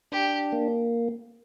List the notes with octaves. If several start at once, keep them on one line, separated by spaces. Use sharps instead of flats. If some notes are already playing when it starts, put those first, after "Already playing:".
D4 G4
A#3